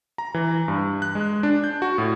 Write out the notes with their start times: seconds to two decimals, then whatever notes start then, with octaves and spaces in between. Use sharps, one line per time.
0.18 A#5
0.34 E3
0.68 G2
1.02 F#6
1.15 G#3
1.43 D4
1.64 G6
1.82 F#4
1.98 A2